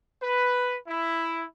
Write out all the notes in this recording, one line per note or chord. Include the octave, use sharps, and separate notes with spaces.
B4
E4